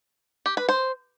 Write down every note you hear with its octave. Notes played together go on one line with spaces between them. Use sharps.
G4
B4
C5